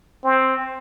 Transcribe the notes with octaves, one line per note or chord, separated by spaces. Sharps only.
C4